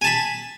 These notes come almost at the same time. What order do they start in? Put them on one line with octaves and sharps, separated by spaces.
G#5 A5 B5